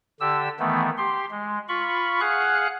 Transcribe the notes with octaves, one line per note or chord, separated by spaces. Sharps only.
D3 G4 E6
D#3 E3 A3 B3
G4 C6
G#3
F4 B5 C#6
G#4 F5 F#5 F#6